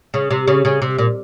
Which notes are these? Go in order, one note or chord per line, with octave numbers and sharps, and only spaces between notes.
C#3
C3
C#3
C#3
C3
A#2